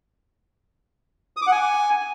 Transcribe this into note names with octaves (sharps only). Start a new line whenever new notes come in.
D#6
D6
F#5
G#5